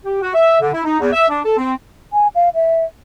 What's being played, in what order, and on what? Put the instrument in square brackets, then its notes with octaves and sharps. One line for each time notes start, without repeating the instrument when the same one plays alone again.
[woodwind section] G4
F#4
E5
D3
E4
D#4
E2
E5
D4
A4
C4
[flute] G#5
F5
E5